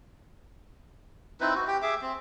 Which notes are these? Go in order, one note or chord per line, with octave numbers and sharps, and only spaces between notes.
C4 D#4 E4 B4
F#4
G4 G5
G#4 E5 D6
C4